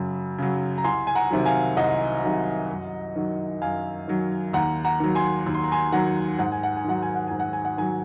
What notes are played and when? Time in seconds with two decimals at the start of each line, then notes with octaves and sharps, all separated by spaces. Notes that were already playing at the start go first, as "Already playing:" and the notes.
Already playing: F#2 C#3 F#3
0.38 C#3 F#3
0.78 A#5
0.84 C2 G#5 C6
1.07 G#5
1.15 F#5 A#5
1.30 C3 D#3 F#3
1.45 F5 G#5
1.77 C2 D#5 F#5
2.23 C3 D#3 F#3
2.69 F#2
3.16 D#3 F#3
3.62 F#2 F5 G#5
4.08 D#3 F#3
4.53 D#2 F#5 A#5
4.85 F#5 A#5
5.00 D#3 F#3
5.15 G#5 C6
5.46 D#2
5.54 C6
5.64 A#5
5.72 G#5 C6
5.92 D#3 F#3 F#5 A#5
6.39 G#2 F#5
6.52 G#5
6.63 F#5
6.77 G#5
6.84 D#3 F#3 F#5
7.02 G#5
7.15 F#5
7.27 G#2 G#5
7.40 F#5
7.53 G#5
7.65 F#5
7.78 D#3 F#3 G#5